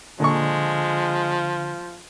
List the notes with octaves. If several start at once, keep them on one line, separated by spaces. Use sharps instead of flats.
A#2 D3 F3 G#3 A4 C#6